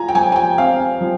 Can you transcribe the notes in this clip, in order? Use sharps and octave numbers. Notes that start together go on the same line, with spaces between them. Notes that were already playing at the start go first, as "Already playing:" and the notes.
Already playing: F4 G#5 A#5
G5
F3 G#5
G#5
G5
C4 F5
F3